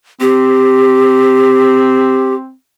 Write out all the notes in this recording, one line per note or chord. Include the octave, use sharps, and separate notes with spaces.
C4 G4